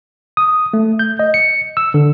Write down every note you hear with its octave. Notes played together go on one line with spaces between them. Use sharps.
D#6
A3
G6
D#5
C#7
E6
D3